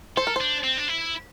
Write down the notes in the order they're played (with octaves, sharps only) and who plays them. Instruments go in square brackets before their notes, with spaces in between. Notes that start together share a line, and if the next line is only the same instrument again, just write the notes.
[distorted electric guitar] A4 [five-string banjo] C5
[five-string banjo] A#4
C5
[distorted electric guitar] D4
C4
D4
E4